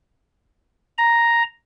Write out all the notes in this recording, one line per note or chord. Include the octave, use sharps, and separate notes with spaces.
A#5